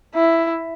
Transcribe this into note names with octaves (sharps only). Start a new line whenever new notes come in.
E4